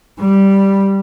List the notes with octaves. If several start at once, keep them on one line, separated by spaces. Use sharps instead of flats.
G3